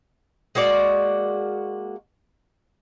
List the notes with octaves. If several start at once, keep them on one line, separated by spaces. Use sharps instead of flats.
G#3 A#3 F#4 D5